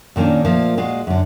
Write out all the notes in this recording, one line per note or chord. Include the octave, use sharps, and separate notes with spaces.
A#2 D#3 A#3 C#4 D4
A#2 F3 A3 A#3
A#2 G#3 F4 F#4
F#2 D3